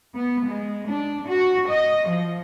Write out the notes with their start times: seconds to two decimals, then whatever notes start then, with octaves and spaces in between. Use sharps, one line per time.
0.16 B3
0.46 G#3
0.87 D4
1.27 F#4
1.68 D#5
2.07 F3